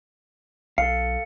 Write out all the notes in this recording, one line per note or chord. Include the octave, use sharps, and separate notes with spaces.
B1 A4 F5 C#7